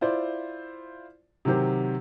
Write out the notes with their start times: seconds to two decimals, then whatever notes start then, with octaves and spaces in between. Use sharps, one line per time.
0.01 E4 F4 C5 D5
1.45 C3 D#3 F#3 G4 C5